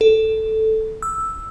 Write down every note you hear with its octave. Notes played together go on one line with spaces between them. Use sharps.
A4
E6